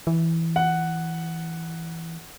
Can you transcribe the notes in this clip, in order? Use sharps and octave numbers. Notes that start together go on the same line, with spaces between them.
E3
F#5